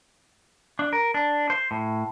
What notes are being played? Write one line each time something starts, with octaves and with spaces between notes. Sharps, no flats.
D4
A#4
D4
C5
A2